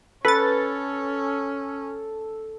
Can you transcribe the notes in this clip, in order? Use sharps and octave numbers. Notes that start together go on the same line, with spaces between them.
C#4 A4 B4 A6